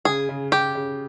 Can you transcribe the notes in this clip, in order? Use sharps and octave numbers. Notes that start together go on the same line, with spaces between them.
C#3 G#4
C#3
C#3 G4
C#3